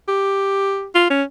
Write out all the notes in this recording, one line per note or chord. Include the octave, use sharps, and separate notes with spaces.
G4
F4
C#4